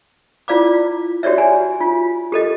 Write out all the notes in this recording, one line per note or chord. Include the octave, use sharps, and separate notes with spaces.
E4 F4 D5 F5 D6
F#4 G4 C#5 D5 E5
G#5
F4
G4 A4 D#5